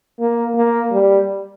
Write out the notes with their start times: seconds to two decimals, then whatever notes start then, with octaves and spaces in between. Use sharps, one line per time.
0.20 A#3
0.56 A#3
0.92 G3